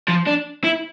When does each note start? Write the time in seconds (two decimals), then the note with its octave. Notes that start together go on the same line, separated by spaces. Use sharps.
0.09 F3
0.27 D4
0.64 E4